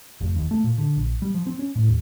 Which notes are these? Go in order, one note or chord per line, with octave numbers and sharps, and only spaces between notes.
F1
D#2
A3
A#2
D3
A#1
G3
F3
C4
C#4
A2
D#2